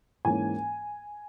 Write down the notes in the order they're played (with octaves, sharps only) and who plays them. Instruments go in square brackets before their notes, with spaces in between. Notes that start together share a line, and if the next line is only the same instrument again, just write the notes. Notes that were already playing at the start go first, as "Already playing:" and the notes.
[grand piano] G#2 E3 A#3 C#4 G#5